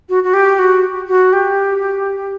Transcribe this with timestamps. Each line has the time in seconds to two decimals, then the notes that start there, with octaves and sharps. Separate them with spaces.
0.09 F#4
0.23 F#4
0.33 G4
0.59 F#4
1.08 F#4
1.33 G4